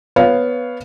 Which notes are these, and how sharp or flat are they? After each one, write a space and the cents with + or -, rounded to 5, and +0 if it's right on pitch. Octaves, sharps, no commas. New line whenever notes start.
B3 +0 C#5 +10 F5 +0